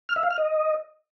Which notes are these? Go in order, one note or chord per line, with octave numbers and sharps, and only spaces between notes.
F6
E5
F5
F6
D#5